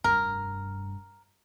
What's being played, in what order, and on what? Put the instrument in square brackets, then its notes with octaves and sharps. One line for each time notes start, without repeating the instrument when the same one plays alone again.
[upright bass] F1 G2 [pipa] A#4